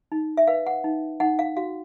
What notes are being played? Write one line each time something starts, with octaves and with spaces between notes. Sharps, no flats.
D#4
E5
B4 F5
F#5
D#4
D#4 F#5
F5
F#4 F5